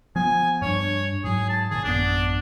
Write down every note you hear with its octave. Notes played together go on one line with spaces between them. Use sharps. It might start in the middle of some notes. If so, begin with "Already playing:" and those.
F3 B3 G#5
G2 D4 C#5
G#2 F#3 G#4
A5
A#2 D#3 G#4
A1 F#2 B3 D4